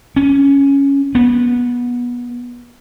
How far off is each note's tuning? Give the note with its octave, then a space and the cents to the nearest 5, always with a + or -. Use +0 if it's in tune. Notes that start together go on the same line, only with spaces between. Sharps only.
C#4 +5
B3 -20